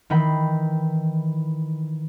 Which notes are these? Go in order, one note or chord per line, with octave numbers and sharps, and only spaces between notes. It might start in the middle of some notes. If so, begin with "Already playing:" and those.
D#3 E3 G5 B5 C7